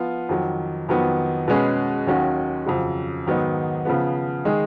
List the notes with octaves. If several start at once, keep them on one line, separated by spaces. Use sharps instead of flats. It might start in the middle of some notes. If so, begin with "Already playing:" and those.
Already playing: F3 B3 F4
F2 D#3 F#3
F2 D#3 F#3 B3
B2 G#3 C#4 G#4 B4
D#2 D#3 F#3 C#4 F#4
F2 C#3 F#3
G#2 D#3 F#3 B3 D#4
C#3 F3 B3
D#3 G#3 D#4 G#4